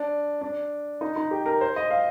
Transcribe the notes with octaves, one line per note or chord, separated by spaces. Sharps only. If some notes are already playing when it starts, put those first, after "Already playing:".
Already playing: D4
D4
D#4
D#4
G4
A#4
C5
D#5
F5